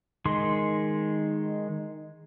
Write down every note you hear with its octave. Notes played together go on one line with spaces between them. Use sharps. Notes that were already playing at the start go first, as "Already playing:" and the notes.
D#3 G#3 C6